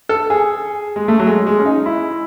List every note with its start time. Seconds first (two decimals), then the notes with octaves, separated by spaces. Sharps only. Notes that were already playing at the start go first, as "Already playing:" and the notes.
0.09 A4
0.30 G#4
0.96 G#3
1.08 A3
1.19 F#3
1.26 G#3
1.47 G#3
1.59 C#4
1.66 D#4
1.86 E4